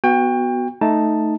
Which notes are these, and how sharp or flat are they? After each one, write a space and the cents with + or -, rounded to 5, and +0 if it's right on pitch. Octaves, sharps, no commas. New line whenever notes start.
B3 +0 F#4 +0 G5 +30
A3 +0 D#4 -5 A5 +0